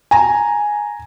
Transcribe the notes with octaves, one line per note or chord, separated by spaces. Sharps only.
G#5 A#5